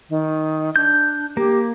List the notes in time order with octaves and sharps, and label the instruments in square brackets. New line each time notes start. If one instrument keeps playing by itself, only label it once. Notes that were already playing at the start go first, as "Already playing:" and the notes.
[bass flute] D#3
[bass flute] D4 [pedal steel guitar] G6
[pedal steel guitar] A#3 [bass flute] G4